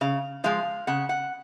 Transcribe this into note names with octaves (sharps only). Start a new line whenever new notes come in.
C#3 F5
F3 G#3 F5
C#3 F#5
F#5